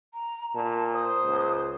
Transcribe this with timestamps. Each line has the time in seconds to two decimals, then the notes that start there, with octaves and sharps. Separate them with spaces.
0.14 A#5
0.54 A#2 A5
0.94 C5 D#6
1.26 C#2